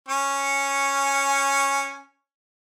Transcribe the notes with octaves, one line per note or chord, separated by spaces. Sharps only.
C#4 G#5 C#6